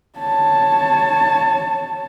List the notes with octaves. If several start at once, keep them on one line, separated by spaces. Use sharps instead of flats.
C#5 A5